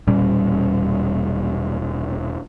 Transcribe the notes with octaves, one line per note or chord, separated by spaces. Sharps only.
E1 A#2 G3 C#4